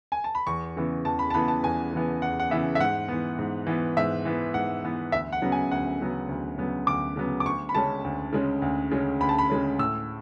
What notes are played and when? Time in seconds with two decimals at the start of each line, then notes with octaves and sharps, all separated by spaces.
0.12 G#5
0.24 A5
0.35 B5
0.47 E2 C#6
0.77 C#3 E3 B3
1.05 E2 A5
1.19 B5
1.30 A5
1.34 C#3 E3 B3 B5
1.48 A5
1.63 E2 G#5
1.92 C#3 E3 B3
2.22 E2 F#5
2.40 F#5
2.50 C#3 E3 B3 E5
2.75 E5
2.79 G#2 F#5
3.08 E3 B3
3.39 G#2
3.67 E3 B3
3.97 G#2 E5
4.25 E3 B3
4.54 G#2 F#5
4.84 E3 B3
5.12 D2 E5
5.32 F#5
5.42 C#3 F#3 B3
5.52 G#5
5.71 D2 F#5
6.01 C#3 F#3 B3
6.29 D2
6.58 C#3 F#3 B3
6.87 D2 D6
7.16 C#3 F#3 B3
7.40 D6
7.45 D2 C#6
7.69 B5
7.75 C#3 G#3 C#4 A5
8.04 D2
8.33 C#3 G#3 C#4
8.62 D2
8.91 C#3 G#3 C#4
9.20 D2 B5
9.29 A5
9.38 B5
9.49 C#3 G#3 C#4
9.79 A2 E6